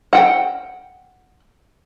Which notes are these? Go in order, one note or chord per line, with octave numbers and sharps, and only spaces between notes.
F#5 G5